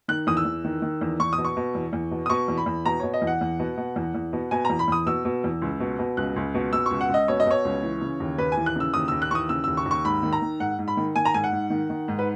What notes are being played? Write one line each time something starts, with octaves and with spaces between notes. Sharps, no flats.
D#3 F#6
E2 D#6
E6
E2
D#3
D#3
E2
E2 C#6
D#6
B2
C#6
B2
E2
E2
B2
D#6
B2 C#6
E2
B5
E2
B2 A#5
B2 C#5
D#5
E2
F#5
E2
B2
B2
E2
E2
B2
B2 G#5
E2 A#5
B5
E2 D#6
B2 E6
B2
E2
C#2
B2
B2
C#2 F#6
C#2
B2
B2 E6
C#2 C#6
F#5
C#2 D#5
B2 C#5
D#5
B2 C#5
C#2
E3
C#3
D#2
D#2 B4
G#5
E3
F#6
C#3 E6
D#2 D#6
D#2 E6
F#6
E3 C#6 D#6
C#3 E6
D#2 E6
C#6
D#2
C#6
G#2 B5
D#3
A#5
D#3
G#2 F#5
G#2
B5
D#3
D#3 G#5
A#5
G#2 G#5
F#5
G#2
D#3
D#3
G#2
B4